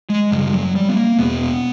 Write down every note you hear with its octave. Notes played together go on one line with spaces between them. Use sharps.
G#3
F#2 C#3 G3
F#3
G3
B3
A#3
E2 B2 B3